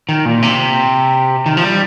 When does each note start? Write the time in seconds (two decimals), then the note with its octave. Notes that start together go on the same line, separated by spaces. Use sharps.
0.09 D#3
0.25 A#2
0.42 C3
1.46 D#3
1.57 F3
1.62 G3